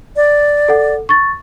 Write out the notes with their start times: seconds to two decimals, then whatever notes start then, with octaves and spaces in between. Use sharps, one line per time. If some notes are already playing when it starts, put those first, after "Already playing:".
0.16 D5
0.68 A4 F#5
1.09 C#6 A6